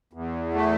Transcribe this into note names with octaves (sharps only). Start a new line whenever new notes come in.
E2
A3